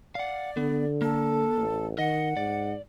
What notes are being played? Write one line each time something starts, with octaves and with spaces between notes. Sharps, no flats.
D5 F5 F#5
D3 B3
A#3 A4
A1
D#3 D#5 F#5
G#2 D5